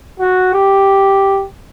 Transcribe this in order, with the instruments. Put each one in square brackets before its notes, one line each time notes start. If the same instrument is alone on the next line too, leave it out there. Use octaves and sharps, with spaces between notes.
[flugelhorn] F#4
G4